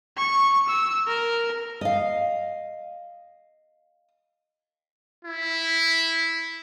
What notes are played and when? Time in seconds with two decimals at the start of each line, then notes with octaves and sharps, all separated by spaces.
0.17 C#6
0.68 E6
1.08 A#4
1.81 D#5 F5
5.25 E4